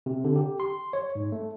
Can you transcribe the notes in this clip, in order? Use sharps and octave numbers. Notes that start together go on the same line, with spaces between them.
C3
D3
G4
C6
C#5
G#2
A3